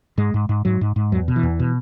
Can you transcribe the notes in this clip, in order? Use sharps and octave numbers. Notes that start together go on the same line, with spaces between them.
G#2 G#3
G#2
G#2
G#2 F#3
G#2
G#2
E2 F#3
B2
E3
E2
B2